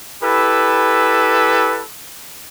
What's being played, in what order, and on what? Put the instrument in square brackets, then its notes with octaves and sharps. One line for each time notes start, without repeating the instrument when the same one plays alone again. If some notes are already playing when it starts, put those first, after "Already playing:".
[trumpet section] E4 G4 A4 B4